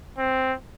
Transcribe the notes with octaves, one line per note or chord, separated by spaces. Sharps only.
C4